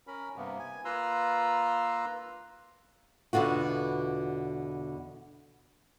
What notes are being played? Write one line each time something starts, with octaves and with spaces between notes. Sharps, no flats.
C#4 A#4 B5
G2 C3 A#3 B3
G#5
A#3 F4 B4 A#5 C6 E6
E2 B2 D3 F4 F#4